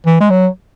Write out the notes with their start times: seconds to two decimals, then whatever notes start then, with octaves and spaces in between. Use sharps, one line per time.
0.07 E3
0.20 G#3
0.30 F#3